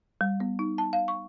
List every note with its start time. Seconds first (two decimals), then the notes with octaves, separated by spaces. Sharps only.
0.21 G3
0.40 B3
0.59 D#4
0.78 A5
0.93 F5
1.08 C#6